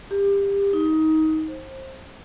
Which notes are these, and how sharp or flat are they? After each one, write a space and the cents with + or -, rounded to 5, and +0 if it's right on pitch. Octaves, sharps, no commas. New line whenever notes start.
G4 +25
D#4 +20
C5 +25